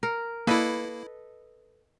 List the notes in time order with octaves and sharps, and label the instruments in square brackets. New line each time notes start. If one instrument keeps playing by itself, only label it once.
[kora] A#4
[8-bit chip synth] A#3 E4 [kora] A4 B4 D#5